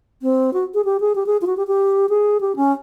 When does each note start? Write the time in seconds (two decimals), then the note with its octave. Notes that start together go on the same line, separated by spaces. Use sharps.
0.22 C4
0.53 F#4
0.74 G#4
0.85 G4
1.00 G#4
1.15 G4
1.26 G#4
1.41 F4
1.47 F#4
1.57 G4
1.67 G4
2.09 G#4
2.41 G4
2.56 C#4